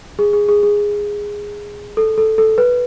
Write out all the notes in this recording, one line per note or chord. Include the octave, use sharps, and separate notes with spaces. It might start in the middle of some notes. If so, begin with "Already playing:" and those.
G#4
G#4
G#4
G#4
A4
A4
A4
B4